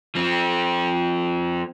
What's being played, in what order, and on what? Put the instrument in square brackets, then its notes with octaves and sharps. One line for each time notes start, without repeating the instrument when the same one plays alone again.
[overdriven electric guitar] F3 C4